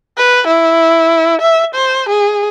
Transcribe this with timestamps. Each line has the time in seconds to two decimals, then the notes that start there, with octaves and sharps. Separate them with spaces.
0.17 B4
0.47 E4
1.41 E5
1.75 C5
2.09 G#4